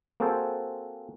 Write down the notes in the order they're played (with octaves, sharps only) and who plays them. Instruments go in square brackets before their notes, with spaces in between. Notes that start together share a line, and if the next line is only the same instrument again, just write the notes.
[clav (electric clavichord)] A#3 C4 F#4 G#4 A4 C5